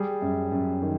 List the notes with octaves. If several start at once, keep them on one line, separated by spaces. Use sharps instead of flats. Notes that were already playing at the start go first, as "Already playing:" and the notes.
Already playing: G3 G#4
F#2
F#2
D#3